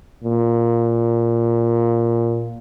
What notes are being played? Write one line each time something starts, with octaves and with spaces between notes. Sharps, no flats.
A#2